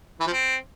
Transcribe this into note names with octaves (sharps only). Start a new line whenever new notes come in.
E3
F3
C4